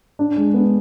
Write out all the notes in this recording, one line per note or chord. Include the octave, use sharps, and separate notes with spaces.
D4
G#3
B3